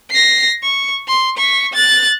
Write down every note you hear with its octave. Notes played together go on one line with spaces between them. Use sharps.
A#6 C7
C#6
C6
C#6 B6
F#6 A6